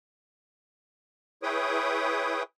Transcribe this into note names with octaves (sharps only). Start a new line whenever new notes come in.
E4 G#4 B4 C#5 G5 D#6